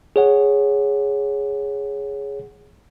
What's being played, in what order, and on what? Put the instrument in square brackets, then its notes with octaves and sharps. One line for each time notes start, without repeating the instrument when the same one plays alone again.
[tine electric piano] G#4 C#5 F#5